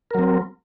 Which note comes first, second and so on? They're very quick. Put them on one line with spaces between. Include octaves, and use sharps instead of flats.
A#4 F#3 C4